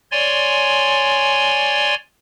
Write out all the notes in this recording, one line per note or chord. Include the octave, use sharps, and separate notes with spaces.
C#5 D5 G#5 C6